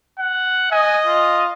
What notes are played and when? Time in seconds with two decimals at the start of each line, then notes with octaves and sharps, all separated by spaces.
0.19 F#5
0.72 D#5 G#5
1.06 F4